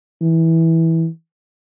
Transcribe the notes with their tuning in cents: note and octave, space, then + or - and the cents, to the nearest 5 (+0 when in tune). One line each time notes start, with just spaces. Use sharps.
E3 -15